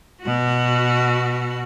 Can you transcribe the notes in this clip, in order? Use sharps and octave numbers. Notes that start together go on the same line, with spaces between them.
B2 F#4